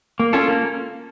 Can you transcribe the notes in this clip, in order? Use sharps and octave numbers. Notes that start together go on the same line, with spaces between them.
A#3
C#4 F4 A4
A#3